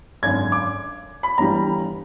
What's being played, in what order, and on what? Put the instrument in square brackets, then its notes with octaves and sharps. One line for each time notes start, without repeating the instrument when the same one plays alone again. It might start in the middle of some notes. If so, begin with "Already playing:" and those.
[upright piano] G#1 F#2 D3 G#6
D6
B5
G1 G2 E3 G3 A#5